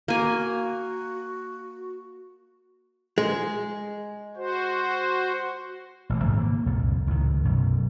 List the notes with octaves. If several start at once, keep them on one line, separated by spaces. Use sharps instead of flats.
A#3 F#4 G#5
G#3
F#4 C5
A1 B2 E3
G#2 C3 D#3 G#3
A#3
C2 F2 A#2
C#2 A2 D#3
B1 F#2 B2